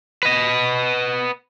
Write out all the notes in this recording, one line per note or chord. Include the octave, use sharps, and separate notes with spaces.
B4 D#5